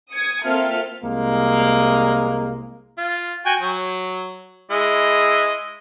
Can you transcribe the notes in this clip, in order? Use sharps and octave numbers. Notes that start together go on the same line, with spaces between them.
D#6 G#6 C#7
A#3 C4 F4 A4 E5 F6
C2 G#3 A#3
F4
F#4 G5 G#5
F#3
G#3 E4 D#5